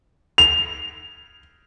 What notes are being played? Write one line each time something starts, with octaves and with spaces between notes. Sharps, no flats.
F7